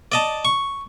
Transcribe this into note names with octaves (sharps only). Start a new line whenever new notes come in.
D5 D#5 A5
C#6